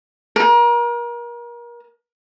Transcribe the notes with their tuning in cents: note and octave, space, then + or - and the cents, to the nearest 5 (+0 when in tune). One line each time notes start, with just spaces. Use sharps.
A#4 +35